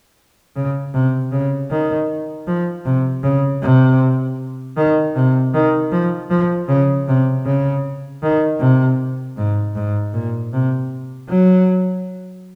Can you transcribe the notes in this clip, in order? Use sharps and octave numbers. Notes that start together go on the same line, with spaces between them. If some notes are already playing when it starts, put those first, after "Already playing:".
C#3
C3
C#3
D#3
F3
C3
C#3
C3
D#3
C3
D#3
F3
F3
C#3
C3
C#3
D#3
C3
G#2
G#2
A#2
C3
F#3